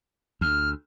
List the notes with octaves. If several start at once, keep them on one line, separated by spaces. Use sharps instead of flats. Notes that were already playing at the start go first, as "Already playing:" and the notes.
D2 F6